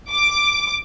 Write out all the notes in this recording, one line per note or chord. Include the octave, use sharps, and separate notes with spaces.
D6